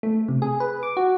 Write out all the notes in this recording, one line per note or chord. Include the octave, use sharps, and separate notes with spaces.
A3
C3
G#4
B4
D6
F#4